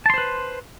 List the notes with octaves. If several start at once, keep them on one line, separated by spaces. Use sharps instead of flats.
B4 C5 A5 C6